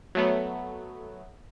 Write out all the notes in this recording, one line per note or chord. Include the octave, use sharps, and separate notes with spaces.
F#3 A3 B3